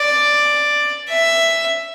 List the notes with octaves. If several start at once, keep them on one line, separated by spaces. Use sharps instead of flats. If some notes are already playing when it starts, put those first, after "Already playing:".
Already playing: D5
E5